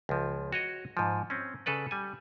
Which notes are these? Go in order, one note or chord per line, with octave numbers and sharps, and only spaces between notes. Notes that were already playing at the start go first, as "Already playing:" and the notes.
C#2 F3
F#4 C#5 D#5
G#2 F3
C4 C#4
C#3 A4 B4 D5
G3 G#5